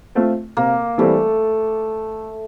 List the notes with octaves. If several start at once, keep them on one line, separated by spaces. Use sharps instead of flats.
A3 C4 F4
C3 A#3
E3 G3 A3 C4